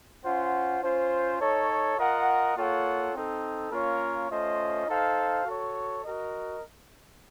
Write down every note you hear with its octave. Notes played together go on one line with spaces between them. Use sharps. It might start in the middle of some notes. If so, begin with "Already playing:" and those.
C#4 F4 C5 F#5
C#4 F4 C5
D#4 A4 C#5
F4 A#4 D#5 F#5
A#3 F4 A4 C#5 F#5
C4 D#4 A4
A#3 C#4 F4 A#4 C#5
A3 C#4 F4 C5 D#5
D#4 A4 C5 F5
F#4 A4 C#5
F#4 A#4 D#5